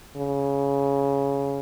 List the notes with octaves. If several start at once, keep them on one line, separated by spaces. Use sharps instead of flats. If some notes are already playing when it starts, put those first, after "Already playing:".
C#3